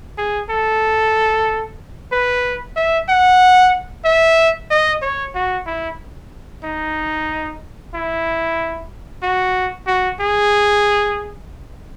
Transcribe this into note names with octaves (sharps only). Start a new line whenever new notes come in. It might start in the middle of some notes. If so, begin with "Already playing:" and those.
G#4
A4
B4
E5
F#5
E5
D#5
C#5
F#4
E4
D#4
E4
F#4
F#4
G#4